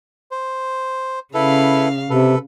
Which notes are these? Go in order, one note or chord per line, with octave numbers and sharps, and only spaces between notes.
C5
C#3 E4 A4 B4 F5
C3 A4 B4